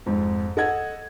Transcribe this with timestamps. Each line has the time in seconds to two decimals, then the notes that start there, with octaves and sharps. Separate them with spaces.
0.06 F2 G#2
0.57 A4 D#5 F#5 G#6